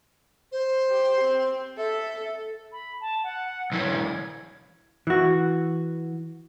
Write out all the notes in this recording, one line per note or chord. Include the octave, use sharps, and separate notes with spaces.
C5
G4
C4
A4 E5
B5
A5
F#5
B1 E3 G#6
E3 F#4